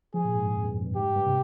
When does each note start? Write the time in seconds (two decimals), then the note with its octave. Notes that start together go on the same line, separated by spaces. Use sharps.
0.14 F3 G#4
0.24 A#2
0.35 G#2
0.45 G2
0.55 F2
0.65 G2
0.75 F2
0.86 G2
0.96 G#2 G4
1.06 G2
1.16 G2
1.26 C3